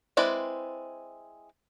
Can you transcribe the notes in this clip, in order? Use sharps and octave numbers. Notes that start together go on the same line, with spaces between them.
G#3 C4 E4 B4 D5